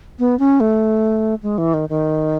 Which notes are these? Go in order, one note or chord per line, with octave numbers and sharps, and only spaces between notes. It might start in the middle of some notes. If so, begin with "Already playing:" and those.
B3
C#4
A3
G#3
E3
D#3
D#3